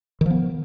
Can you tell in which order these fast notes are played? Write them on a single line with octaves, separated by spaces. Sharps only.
D#3 F3 B3